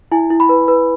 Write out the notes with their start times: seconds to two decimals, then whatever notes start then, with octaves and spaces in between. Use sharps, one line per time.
0.12 E4 G#5
0.30 E4
0.40 B5
0.49 B4
0.68 B4